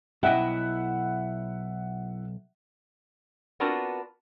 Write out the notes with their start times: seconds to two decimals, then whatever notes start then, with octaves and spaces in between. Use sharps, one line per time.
0.23 B1 E4 D#5 E5 F#5 G5
3.60 B3 C4 D4 F4 F#4 A#4